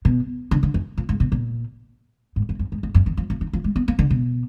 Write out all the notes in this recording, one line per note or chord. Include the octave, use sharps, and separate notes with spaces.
B2
D3
D3
F#2
A#2
G#2
B2
A#2
G#2
F#2
F#2
G#2
G#2
F#2
D#3
F3
F3
D#3
F3
G#3
B3
A#3
D3
B2